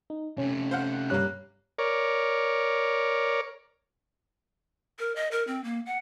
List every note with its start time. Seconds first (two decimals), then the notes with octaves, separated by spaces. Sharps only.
0.10 D#4
0.38 C3 A3 C#4
0.71 C5 F5 F#5
1.10 G2 G3 A#3 C#5 F#6
1.79 A#4 C#5 D5
4.99 A#4
5.16 D#5
5.31 A#4
5.47 C4
5.64 A#3
5.86 F#5